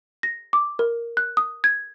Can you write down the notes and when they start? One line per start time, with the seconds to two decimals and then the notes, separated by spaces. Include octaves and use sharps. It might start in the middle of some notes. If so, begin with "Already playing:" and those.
0.23 A#6
0.53 D6
0.79 A#4
1.17 F#6
1.37 D#6
1.64 G#6